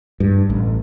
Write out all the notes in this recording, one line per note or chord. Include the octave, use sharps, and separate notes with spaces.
G2
A1